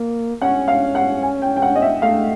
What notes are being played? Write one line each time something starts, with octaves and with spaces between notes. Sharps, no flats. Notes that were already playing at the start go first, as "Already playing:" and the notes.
Already playing: A#3
C#4 F#5
F5
F#5
G#5
G5
G5
F#5
D#5
E5
A3 F5